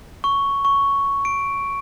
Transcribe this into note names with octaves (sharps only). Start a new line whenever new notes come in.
C#6
C#6
D7